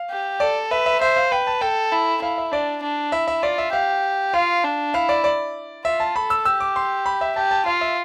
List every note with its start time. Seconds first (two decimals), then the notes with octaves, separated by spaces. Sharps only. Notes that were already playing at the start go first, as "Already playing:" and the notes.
Already playing: F5
0.10 G4
0.40 A4 D5
0.71 B4 E5
0.86 E5
1.01 C5 E5
1.17 F5
1.31 B4 G5
1.47 A5
1.61 A4 G5
1.92 E4
2.22 E4 F5
2.38 E5
2.52 D4 D5
2.83 D4
3.12 E4 E5
3.28 E5
3.43 F4 D5
3.58 E5
3.73 G4 F5
4.34 F4 F5
4.64 D4
4.94 E4 F5
5.09 D5
5.24 D5
5.85 F4 E5
6.00 A5
6.15 A4 B5
6.30 E6
6.45 G4 E6
6.60 D6
6.76 C6
7.06 B5
7.21 E5
7.36 G4 A5
7.51 A5
7.66 F4 F5
7.81 E5